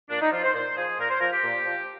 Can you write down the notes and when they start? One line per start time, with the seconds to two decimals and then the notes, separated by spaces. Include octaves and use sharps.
0.10 A#2 D4
0.21 D#4
0.32 F3 F4
0.43 C5
0.54 A#2 C5
0.76 F3 G#4
0.99 A#2 A#4
1.10 C5
1.21 F3 A#4
1.32 G4
1.43 A#2
1.65 F3